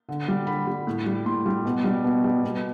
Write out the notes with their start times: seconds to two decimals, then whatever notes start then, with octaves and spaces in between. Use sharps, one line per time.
0.09 D3
0.28 G3
0.47 D3 B5
0.67 G3
0.87 A2
1.06 G3
1.26 A2 C6
1.46 G3
1.65 B2
1.84 G3
2.04 B2
2.24 G3
2.44 B2